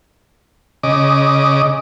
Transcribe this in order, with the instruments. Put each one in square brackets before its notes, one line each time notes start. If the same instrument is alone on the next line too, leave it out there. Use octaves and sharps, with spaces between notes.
[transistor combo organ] C#3 D#5 D6